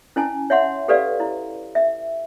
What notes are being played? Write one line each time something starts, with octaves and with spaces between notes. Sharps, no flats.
C#4 E4 G#5 A5
C#5 E5 F#5 C6
G4 A4 B4 D5 F5
E4
E5